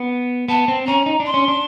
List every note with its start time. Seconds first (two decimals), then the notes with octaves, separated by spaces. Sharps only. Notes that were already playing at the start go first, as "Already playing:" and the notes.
Already playing: B3
0.48 B3 A5
0.68 C4
0.87 C#4 A#5
1.06 D#4
1.20 D4
1.26 C6
1.34 C#4
1.48 D4